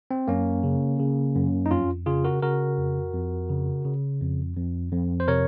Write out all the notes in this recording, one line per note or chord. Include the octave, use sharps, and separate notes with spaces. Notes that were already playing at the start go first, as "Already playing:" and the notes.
C4
F#2 A#3 C#4
C#3
C#3
F#2
D#4
F2 C#4 F4
C#3 F4 G#4
F#4 A#4
C#3 F#4 A#4
F2
F2
C#3
C#3
F2
F2
F2
C5
C3 A#4 C#5